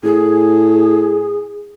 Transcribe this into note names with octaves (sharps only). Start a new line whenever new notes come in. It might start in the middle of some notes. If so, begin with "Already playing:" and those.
A2 G#4